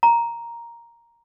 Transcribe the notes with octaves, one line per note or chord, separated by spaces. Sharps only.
A#5